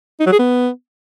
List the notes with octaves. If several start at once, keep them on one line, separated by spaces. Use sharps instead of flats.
D#4
F#3
G#4
B3